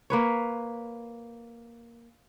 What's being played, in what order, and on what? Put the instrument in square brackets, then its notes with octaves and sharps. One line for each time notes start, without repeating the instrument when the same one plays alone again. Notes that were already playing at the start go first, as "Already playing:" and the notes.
[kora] A#3 B4 C#5